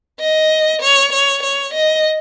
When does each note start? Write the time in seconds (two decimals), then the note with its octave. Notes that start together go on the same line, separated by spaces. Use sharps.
0.20 D#5
0.82 C#5
1.13 C#5
1.43 C#5
1.74 D#5